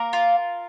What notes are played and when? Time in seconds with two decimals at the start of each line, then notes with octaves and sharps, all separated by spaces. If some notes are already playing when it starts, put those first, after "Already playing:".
Already playing: A#3 A#4 A#5
0.13 F4